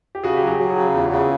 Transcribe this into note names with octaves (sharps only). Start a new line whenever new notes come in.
G4
C#3 F#4 G#4
F#3 G4
F#4 G#4
F#3 G4
F#4 G#4
C#3
E2 F4 G4
C#3